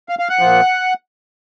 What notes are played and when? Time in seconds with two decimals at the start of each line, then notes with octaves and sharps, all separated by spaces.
0.09 F5
0.19 F5
0.29 F#5
0.39 A#2 F3